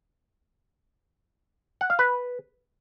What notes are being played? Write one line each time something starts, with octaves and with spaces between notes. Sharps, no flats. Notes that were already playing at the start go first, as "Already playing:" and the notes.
F#5
F5
B4